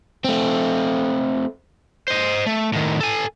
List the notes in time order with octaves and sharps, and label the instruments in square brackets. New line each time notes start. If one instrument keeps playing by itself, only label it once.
[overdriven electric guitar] A3 C4
C5 D#5
A3
A2 D#3
A4 G#5